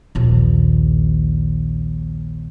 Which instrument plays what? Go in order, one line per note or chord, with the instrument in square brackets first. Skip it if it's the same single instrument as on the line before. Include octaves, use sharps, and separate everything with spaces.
[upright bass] A#1 D#2